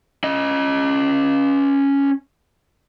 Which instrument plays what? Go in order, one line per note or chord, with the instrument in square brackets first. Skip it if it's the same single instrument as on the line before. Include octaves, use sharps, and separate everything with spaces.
[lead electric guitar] C#4 D#5